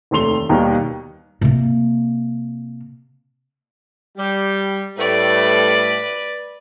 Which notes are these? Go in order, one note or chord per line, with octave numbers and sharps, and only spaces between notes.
F1 D#2 A3 C6 F7 G7
D#2 B2 D#3 G3 A#3
C3 A#3
G3
A2 G3 A3 B4 D5